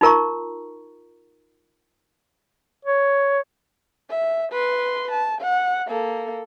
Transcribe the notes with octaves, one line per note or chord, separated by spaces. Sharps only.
D#4 F4 A#4 A#5 C#6
C#5
E5
B4 C6
A5
F#5
A#3 A4